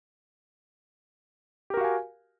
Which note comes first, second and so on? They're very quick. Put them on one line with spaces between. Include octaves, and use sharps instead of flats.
G4 A#4 F#4 F5 G#5